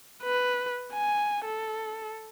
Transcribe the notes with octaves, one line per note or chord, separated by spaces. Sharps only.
B4
G#5
A4